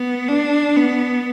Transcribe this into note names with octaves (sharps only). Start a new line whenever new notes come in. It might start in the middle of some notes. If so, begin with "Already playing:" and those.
Already playing: B3
D4
B3